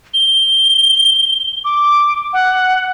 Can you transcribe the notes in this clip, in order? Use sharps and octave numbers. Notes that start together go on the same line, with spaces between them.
G7
D6
F#5